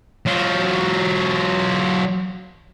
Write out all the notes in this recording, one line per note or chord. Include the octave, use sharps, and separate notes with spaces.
F#3 F4